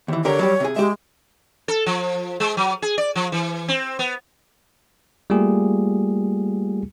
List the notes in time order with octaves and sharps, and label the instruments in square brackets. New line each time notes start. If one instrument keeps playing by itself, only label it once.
[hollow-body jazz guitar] D#2 E3
[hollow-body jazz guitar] D3 G4 A#4 [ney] C#5
[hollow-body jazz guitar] F#3 G3 G4
C3 G#4
[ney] G#3 [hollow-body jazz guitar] G4 E5
[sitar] A4
F3
G#3
F#3
G#4
D5
F3
E3
C4
B3
[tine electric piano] G3 A3 A#3 F4 G4 G#4